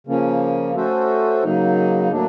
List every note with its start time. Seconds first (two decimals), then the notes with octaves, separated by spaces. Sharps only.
0.07 C#3 F3 A#3 C#4
0.75 A3 C#4 F#4 A4 C5
1.43 C#3 F#3 A#3 D#4
2.11 A2 F#3 A#3 D4